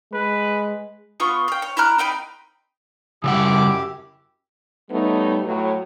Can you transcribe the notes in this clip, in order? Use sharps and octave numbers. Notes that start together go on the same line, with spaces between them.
G#3 B4
B3 F4 C#6
F5 G5
C#5
E4 A#5 F6 F#6
C4 D#4 G5 B5
F#2 C#3 G3 E4 G4 F#5 D6
G3 A3 B3 D#4 C#5
A2 F#3